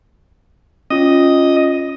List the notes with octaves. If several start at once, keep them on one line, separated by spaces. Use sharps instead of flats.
C#4 F4 D#5